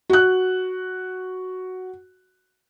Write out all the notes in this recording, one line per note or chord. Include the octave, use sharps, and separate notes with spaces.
F#4 F#6